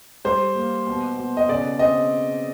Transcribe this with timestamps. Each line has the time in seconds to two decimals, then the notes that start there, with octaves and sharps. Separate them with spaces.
0.25 G3 C5
0.55 A#3
0.87 B2
1.17 B2
1.37 D#5
1.49 C#3 D5
1.79 C4 D#5